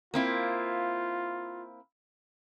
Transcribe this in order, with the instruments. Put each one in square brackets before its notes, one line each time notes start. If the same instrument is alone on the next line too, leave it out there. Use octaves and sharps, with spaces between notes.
[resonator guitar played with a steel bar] A#3 C4 E4 [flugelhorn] F4